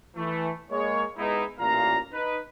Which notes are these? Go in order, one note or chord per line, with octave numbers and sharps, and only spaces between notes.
E3 A3
G#3 A#3 C#5
G#3 B3 D#4 E4
A1 A#2 F5 A#5
D#4 B4